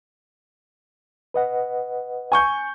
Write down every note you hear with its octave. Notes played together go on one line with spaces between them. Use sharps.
B4 D#5 F#5
G#5 C#6 G6